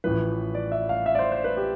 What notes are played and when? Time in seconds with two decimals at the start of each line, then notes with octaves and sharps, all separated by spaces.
0.04 A1 A2 F3 B4
0.55 D5
0.72 E5
0.89 F5
1.06 E5
1.15 D5
1.19 C5
1.32 C5
1.44 B4
1.57 G4